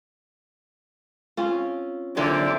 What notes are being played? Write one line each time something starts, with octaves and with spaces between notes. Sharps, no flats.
C4 C#4 F4
A#2 D3 F#3 A4 C5 D5 E5